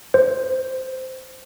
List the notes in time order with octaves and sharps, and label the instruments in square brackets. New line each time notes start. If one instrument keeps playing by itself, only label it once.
[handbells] C5